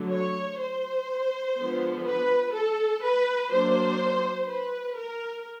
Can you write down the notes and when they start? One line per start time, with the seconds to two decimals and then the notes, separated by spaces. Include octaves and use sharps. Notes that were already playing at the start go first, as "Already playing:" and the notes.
Already playing: D3 F#3 A3
0.11 C#5
0.60 C5
1.57 D3 F3 G#3 B3
2.06 B4
2.54 A4
3.02 B4
3.51 F#3 A#3 D4 C5
4.48 B4
4.97 A#4